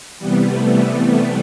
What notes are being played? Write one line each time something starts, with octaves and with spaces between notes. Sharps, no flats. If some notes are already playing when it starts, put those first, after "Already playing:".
C3 E3 G3 B3
A3
G3